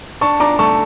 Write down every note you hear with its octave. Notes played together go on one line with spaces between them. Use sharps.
D4 A5 C#6
D4 A#5 D6
A3 A5 C#6